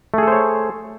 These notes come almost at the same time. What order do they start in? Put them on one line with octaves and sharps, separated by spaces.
A3 G#4 A4 C5 C#5